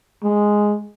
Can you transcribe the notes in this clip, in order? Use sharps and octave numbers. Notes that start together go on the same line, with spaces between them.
G#3